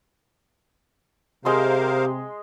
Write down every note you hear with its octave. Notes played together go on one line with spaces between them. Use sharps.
C3 G#3 G4 A#4 C5 F5 C6 D#6